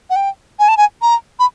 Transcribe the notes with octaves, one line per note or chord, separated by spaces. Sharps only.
F#5
G5
G#5
A5
G#5
A#5
B5